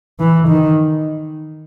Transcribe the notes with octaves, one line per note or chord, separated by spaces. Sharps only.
E3
D#3